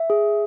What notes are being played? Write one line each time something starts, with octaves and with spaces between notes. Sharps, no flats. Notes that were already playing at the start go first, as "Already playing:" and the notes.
Already playing: E5
G#4